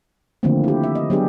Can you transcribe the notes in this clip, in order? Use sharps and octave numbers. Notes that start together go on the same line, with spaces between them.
D3 D#3 F3 A3 A#3 C4
E4 G4
E5
D#5
F#3 G3 B3 D4 G4 G#4